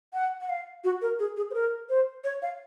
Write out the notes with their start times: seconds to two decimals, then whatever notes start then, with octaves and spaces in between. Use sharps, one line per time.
0.14 F#5
0.41 F#5
0.49 F5
0.84 F#4
1.02 A#4
1.19 G#4
1.37 G#4
1.51 C5
1.54 A#4
1.89 C5
2.24 C#5
2.42 F5